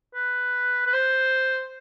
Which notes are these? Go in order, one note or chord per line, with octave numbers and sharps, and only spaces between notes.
B4
B4
C5